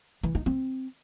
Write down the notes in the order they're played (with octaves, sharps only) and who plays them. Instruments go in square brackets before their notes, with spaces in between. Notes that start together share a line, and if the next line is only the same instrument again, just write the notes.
[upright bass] E3
D#4
C4